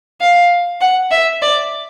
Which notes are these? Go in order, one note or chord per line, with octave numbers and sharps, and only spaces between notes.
F5
F#5
E5
D5